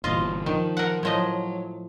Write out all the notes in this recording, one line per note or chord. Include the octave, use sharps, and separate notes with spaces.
G1 A#2 E3 F4 D#5
D#3 F3
A#4 F#5
A2 F3 F#3 D#5